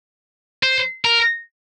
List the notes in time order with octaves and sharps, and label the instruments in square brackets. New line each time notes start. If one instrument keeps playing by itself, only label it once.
[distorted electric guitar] C5
A#4